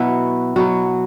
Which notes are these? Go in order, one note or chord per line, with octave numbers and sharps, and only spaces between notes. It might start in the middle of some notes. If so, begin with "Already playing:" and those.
Already playing: B2 F#3 B3 E4 F#4
B2 F#3 B3 F#4